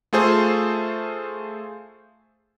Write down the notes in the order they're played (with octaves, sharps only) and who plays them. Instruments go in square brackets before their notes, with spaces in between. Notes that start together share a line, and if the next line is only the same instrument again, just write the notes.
[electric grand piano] A3 F4 G#4 A4 C5